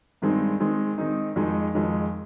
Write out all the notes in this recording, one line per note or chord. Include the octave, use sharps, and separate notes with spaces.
G2 D#3 G#3 C4 D#4
D#3 G#3 C4 D#4
D#3 G#3 C4 D#4
F2 D#3 G#3 D#4
F2 D#3 G#3 D#4